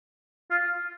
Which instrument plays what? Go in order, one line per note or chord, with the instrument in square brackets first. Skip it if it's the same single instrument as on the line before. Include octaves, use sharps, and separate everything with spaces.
[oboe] F4